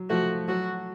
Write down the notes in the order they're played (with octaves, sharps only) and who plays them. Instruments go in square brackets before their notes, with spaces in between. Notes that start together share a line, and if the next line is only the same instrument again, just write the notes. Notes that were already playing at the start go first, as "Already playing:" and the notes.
Already playing: [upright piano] F#3
[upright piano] F3 A3 [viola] F#4
[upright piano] F#3 [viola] F#4